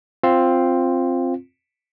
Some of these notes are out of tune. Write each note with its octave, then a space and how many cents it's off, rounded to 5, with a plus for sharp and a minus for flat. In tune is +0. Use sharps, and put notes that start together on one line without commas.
C4 +5 F4 +0